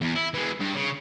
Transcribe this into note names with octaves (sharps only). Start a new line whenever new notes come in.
E2
E4
E3 G#3
G2
C#3